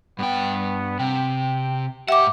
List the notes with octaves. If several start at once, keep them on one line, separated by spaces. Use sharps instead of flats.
G2 B3 G5
C3 G5
G#2 G4 E5 F#5 D6